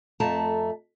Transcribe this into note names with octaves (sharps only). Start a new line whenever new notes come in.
F2 A3 A5 A#5